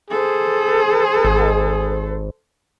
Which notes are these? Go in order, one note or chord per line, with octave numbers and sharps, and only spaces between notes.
G#4 A4 C5
G#1